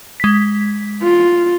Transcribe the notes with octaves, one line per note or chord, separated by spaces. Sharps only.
G#3 B6
F4